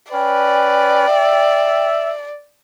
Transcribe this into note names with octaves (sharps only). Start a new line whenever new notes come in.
C#4 B4 D5 G5
E5